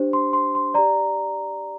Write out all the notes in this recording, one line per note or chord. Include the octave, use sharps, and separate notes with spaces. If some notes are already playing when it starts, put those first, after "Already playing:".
Already playing: D4 G4 C5
C6
C6
C6
G4 D5 A#5